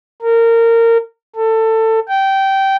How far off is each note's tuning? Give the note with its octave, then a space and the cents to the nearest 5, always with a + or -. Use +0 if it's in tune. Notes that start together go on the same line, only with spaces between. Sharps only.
A#4 -20
A4 +20
G5 -15